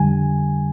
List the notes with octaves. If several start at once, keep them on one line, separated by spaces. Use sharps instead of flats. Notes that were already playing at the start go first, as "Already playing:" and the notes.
Already playing: F2 D3 G3 G#5